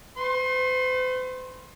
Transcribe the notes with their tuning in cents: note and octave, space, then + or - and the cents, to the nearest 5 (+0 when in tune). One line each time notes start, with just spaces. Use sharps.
C5 -45 C6 +35